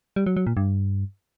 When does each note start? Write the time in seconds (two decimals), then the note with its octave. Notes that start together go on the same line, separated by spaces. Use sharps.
0.16 G3
0.26 F#3
0.37 F#3
0.47 A#2
0.57 G2